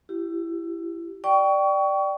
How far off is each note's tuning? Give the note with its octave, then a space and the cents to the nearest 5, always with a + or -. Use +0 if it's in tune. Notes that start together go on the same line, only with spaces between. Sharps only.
E4 +20 G4 -10
D5 +10 G5 -15 C#6 +25